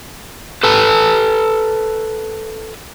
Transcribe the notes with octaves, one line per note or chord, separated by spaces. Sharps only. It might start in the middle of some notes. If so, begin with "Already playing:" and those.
A4 B4 A5